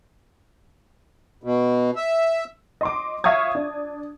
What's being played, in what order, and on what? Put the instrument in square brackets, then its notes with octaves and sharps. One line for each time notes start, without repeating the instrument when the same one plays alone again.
[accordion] B2
E5
[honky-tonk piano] D#5 C6 D6
E5 F5 C#6 D#6 G#6
D4